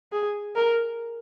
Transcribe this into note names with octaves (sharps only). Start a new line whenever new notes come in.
G#4
A#4